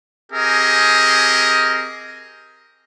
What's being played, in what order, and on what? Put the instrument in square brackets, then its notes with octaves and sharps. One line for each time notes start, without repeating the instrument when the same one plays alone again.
[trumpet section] C4 G4 G#4 A#4 D#5 G#5